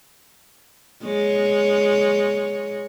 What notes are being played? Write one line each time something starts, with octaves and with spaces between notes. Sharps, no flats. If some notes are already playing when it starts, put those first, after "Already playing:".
G#3 C#5